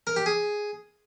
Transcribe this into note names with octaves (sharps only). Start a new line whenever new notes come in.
A#4
G4
G#4